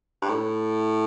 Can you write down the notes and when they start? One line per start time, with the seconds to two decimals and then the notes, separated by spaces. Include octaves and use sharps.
0.22 G2
0.29 A2